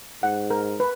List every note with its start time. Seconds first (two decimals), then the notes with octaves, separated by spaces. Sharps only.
0.23 G#2 F#5
0.51 A#4
0.80 B4